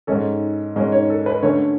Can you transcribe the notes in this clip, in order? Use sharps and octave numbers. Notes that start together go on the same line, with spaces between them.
G#2 G#3 C#4 A4
G#2 G#3 C#4
C#5
A4
B4
D3 A3 C#4 C#5